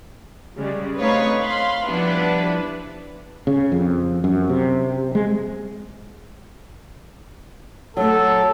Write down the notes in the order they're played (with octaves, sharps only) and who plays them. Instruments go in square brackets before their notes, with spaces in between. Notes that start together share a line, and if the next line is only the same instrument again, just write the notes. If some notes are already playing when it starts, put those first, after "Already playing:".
[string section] C#3 G3 G#3
A3 C4 D#4 B4 C#5 F5
F5 B5 C6
F3 G3 B3 D4 E4 B4
[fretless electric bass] C#3
F2
F#2
C3
G#3
[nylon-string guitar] F#3 A3 [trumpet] A4